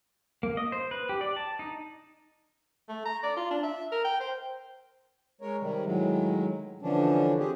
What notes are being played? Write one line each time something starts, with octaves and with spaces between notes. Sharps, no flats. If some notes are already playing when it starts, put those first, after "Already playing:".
A#3
D#5
C5
B4
G4
D5
A5
D#4
A3
A#5
D5
F4
D4
E5
A#4
G5
C5
G#3 A#4 C#5
C3 D#3 G3
A2 D#3 F#3 G#3
D3 E3 F3 C#4 D4
C4 G4 G#4